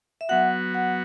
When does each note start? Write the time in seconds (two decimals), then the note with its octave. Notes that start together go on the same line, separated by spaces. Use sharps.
0.21 E5
0.29 F#3 B3 F#4 F#5
0.74 F#5